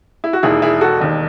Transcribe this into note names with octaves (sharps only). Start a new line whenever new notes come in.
E4
F#4
E1 D#2 D#3 E4 G#4
E4 G#4
F#4 A4
E1 D#2 D#3